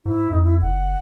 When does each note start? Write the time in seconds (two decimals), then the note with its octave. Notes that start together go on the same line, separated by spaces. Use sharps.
0.06 G#2 E4
0.31 F2 D#4
0.44 E4
0.61 F#1 F#5